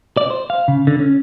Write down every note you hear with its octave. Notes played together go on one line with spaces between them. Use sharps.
D5
C5
F5
C#3
D3
C#4